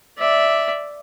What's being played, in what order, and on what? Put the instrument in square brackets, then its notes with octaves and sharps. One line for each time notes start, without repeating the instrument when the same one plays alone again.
[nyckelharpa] D5 E5